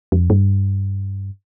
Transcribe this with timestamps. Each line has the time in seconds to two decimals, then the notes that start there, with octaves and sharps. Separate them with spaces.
0.12 F2
0.30 G2